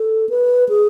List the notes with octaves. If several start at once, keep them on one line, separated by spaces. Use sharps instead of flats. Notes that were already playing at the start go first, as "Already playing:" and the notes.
Already playing: A4
B4
G#4